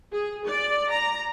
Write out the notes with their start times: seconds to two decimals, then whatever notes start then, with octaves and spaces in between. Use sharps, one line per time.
0.12 G#4
0.47 D5
0.92 A#5